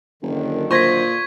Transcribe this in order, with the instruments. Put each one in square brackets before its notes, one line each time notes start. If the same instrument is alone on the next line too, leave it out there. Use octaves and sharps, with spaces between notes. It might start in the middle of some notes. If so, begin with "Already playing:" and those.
[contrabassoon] F#1 [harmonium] F#2 D3 D#3
[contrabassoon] A#2 [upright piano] C5 C6 A#6 [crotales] C#6 G#6 B6